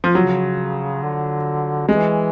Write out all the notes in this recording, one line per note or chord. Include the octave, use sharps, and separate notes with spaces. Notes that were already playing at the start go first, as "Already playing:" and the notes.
F3
C#3 F#3
D3
E3 G#3